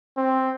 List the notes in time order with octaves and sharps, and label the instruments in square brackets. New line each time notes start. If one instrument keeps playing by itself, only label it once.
[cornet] C4